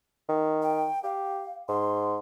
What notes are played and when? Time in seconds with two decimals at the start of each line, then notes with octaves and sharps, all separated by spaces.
0.29 D#3
0.62 G5
1.04 G4 F5
1.68 G#2 C6